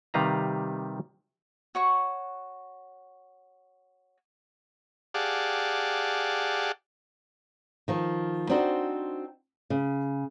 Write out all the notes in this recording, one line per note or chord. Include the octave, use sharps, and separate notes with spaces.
C3 D#3 G3 B4 F5 A#5
F#4 C#5 C#6
G4 G#4 D5 F5 F#5 A5
D#3 F3
C4 D4 D#4 F#4 C5
C#3